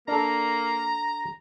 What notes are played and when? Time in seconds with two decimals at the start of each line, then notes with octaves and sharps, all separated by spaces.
0.08 A#3 D4 A4 A#5